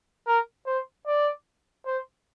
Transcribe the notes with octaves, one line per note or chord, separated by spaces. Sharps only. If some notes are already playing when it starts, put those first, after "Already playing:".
A#4
C5
D5
C5